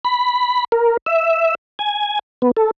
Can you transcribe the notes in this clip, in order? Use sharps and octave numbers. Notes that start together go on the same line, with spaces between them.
B5
A#4
E5
G#5
B3
A4